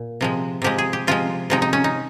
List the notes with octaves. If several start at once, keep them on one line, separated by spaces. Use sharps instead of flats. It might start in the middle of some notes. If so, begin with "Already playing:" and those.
Already playing: A#2
C3 F3 G#3
C3 F3 G#3 G4
G#4
G4
C3 F3 G#3 F4
C3 F3 G#3 D#4
D#4
C#4
D#4